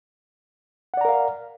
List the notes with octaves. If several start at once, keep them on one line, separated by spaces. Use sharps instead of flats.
A#4 D5 F5 F#5 A#5